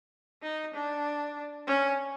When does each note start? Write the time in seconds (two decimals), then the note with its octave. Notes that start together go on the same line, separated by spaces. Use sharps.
0.43 D#4
0.74 D4
1.67 C#4